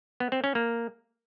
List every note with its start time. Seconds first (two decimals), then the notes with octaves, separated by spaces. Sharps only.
0.20 B3
0.32 C4
0.44 C#4
0.55 A#3